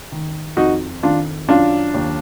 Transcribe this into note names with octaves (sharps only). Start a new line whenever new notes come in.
D#3
F2 D#4 F#4
D#3 D4 F4
F#2 D4 F4
D#2